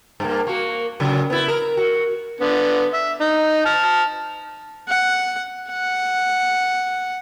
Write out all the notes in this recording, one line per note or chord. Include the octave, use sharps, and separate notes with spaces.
G2 A#3
A#3 F#4
A#2 C#3 F#3
B3 E4
A#4
F#4
D3 B3
E5
D#4
A5 F6
F#5
F#5